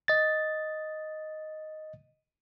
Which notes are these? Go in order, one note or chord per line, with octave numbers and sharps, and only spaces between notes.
D#5 A6